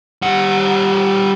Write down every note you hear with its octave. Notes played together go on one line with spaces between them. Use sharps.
G3 F#5